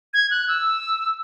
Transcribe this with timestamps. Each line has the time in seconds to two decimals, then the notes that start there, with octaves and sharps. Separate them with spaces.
0.14 G#6
0.31 F#6
0.48 E6